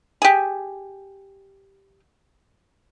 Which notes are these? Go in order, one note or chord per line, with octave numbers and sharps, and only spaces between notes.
G4 G#4